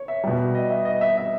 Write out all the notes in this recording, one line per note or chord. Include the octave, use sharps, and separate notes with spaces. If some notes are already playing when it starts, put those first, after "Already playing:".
Already playing: C#5
E5
B2 G3
D#5
E5
D#5
E5
E5